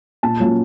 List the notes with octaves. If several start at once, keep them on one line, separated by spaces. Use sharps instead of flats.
A#2 A5
F#3 A#3 C#4 F4